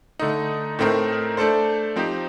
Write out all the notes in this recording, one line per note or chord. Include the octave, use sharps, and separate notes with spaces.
D3 A3 D#4
A2 A3 C4 D#4 A#4
A3 D4 A4 C5
F3 C4 D#4 G4